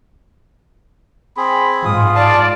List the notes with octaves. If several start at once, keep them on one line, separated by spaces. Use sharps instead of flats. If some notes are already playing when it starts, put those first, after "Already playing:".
C4 G#4 B5
G#2 F4 D#6
D5 F5 A5